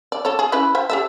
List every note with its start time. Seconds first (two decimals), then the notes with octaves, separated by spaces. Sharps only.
0.12 D5
0.25 A4 C#5
0.39 G#4
0.52 C#4 E4 B4
0.75 C5 E5 G5
0.90 G4 A4 E5